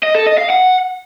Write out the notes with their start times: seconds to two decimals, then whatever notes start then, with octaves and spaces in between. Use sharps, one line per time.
0.03 D#5
0.15 A4
0.27 D#5
0.39 F5
0.50 F#5